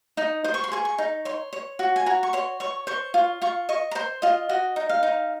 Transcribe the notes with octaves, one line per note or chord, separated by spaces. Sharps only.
D#4 D#6
C5 D#6
C#6
C6
G#4 C#6
C#6
D#4
C#5 C6
C#5
F#4
G#5
F#4 A#5
C#6
C#5 C6
C#5 C#6
C5 C#6
F4
F4 C#6
D#5 C#6
A#5
C5 C6
F4 D#5
F#4 D#5
D#4
F5
D#4